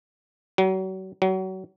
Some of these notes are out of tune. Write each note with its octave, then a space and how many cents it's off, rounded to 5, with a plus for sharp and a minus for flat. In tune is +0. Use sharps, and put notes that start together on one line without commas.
F#3 +35
F#3 +30